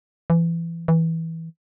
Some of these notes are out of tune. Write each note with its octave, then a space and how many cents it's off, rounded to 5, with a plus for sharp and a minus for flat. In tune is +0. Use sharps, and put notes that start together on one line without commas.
E3 +25
E3 -15